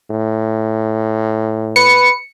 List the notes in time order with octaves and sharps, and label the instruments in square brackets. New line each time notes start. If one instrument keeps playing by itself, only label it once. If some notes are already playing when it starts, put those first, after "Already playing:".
[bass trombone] A2
[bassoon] B4 [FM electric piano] C#7